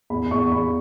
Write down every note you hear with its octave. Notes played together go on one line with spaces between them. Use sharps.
E2 B5
E2 C#6
E2 B5